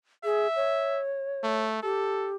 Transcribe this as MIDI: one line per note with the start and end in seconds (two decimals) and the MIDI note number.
0.24 0.47 68
0.24 1.02 76
0.56 1.64 73
1.44 1.81 57
1.83 2.36 67
1.83 2.32 69